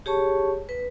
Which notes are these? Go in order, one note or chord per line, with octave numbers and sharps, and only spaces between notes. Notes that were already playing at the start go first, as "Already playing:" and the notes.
G4 G#4 C#5 A5 C#6
B4